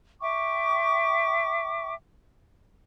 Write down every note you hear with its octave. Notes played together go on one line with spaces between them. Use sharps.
E5 G5 C#6 D6